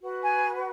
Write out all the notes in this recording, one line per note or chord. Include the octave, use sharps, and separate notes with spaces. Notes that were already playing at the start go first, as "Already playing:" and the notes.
F#4 B4
G#5